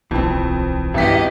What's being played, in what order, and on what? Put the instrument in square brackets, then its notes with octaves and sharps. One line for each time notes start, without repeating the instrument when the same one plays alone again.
[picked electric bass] D1 B1 [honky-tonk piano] F2 [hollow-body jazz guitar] E3 C4
[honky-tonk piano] G#1 E4 B6 [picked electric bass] G2 C4 [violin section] B3 G4 D#5